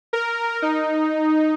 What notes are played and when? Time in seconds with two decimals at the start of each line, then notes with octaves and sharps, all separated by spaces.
0.13 A#4
0.62 D#4